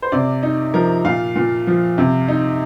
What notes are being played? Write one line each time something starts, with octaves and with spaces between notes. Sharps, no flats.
C5
C3 D5
D#4
F3 A#4
A#2 F5
A#2
F3
C3
D#4